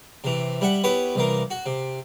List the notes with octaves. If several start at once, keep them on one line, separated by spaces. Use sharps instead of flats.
C3 E3
G3 E5 F#5
B3 E4 G4 B4 C#5
C2 E3 A#3
F#4
C3